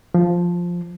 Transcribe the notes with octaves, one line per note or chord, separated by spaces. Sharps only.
F3